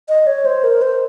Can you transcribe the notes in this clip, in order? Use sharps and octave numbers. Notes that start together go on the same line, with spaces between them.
D#5
C#5
C5
A#4
C5